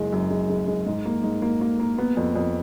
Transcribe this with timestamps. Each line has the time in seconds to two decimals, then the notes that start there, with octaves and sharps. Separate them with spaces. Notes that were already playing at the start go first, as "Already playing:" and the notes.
Already playing: F#1 G#3
0.12 F#2
0.30 G#3
0.49 G#3
0.68 G#3
0.86 G#2
1.05 A#3
1.23 G#2
1.42 A#3
1.61 A#3
1.80 A#3
1.98 B3
2.17 F2
2.35 F2